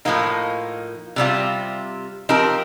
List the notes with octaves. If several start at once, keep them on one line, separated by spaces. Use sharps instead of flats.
A2 F3 A#3 D#4
C3 G3 C4 F4
F3 C4 D#4 G4 A#4